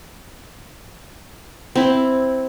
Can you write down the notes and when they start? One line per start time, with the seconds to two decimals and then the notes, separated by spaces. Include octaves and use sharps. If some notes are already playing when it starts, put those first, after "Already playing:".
1.75 C4 E4